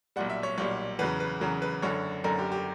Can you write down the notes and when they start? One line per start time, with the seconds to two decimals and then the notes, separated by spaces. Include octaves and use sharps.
0.16 B1 A#2 G3 F#5
0.30 E5
0.43 C#5
0.58 B1 A#2 G3 C#5
0.99 E2 C#3 F#3 B4
1.20 B4
1.41 E2 C#3 F#3 A#4
1.62 B4
1.82 F#1 F#2 D3 C#5
2.24 F#1 F#2 D3 A#4
2.39 G4
2.52 G4